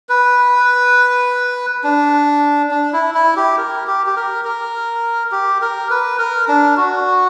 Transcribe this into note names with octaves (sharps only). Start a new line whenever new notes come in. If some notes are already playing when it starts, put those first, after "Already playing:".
B4
D4
D4
E4
E4
G4
A#4
G4
G4
A#4
A#4
G4
A#4
B4
A#4
D4
F#4